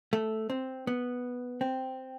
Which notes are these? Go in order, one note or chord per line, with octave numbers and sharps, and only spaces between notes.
A3
C4
B3
C4